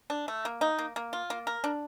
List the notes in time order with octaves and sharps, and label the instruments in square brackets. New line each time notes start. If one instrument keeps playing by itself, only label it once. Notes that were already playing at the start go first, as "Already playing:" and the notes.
[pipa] D4
A3
A#3
D#4
A#3
A#3
F4
A#3
A#4
D4